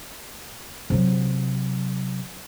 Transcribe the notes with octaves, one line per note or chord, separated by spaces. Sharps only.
C3 F#3